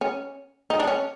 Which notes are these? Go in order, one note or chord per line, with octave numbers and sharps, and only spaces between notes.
C#4
D#4
D4
C#4